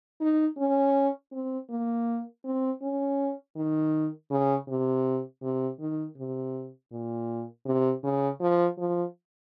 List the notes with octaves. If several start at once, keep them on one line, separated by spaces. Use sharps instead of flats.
D#4
C#4
C4
A#3
C4
C#4
D#3
C#3
C3
C3
D#3
C3
A#2
C3
C#3
F3
F3